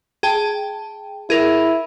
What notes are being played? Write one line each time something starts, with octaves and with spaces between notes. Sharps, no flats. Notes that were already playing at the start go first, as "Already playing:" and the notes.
G#4 G5 A5
E4 G#4 A#4